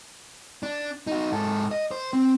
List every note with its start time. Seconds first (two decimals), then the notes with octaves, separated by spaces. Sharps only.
0.63 D4
1.07 D#4 F#4
1.32 G#2 A4
1.71 D#5
1.91 C5
2.13 C4